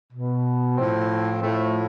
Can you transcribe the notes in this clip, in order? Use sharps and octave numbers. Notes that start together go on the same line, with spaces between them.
B2
A2 F3 C4
A2 F3 A3